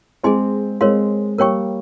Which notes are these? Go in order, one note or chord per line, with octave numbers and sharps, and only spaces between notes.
G#3 C4 G#4 D#5 G#5 C6
G#3 C4 A#4 C#5 F5 C6
G3 A#3 A#4 C#5 G5 C#6